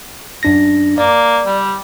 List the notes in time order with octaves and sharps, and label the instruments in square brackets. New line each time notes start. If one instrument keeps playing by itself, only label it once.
[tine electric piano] F#2 D4 A#6
[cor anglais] A#3 [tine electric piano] D5
[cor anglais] G3